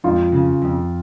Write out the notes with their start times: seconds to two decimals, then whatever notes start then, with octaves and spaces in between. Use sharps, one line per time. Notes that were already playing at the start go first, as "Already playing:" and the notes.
0.04 F2 F4
0.32 C#3
0.62 F2